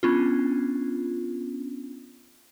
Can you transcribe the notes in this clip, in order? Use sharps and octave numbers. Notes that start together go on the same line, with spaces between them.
B3 C#4 D4 F4